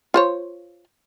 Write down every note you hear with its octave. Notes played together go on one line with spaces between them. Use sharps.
F4 C5 C#5